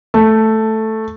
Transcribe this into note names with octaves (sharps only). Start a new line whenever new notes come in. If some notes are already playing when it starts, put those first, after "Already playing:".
A3